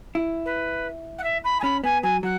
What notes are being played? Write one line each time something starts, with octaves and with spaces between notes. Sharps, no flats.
E4
B4
F#5
E5
B5
G#5
C#4 B5
B3 G#5
F#3 G#5
F#3 F#5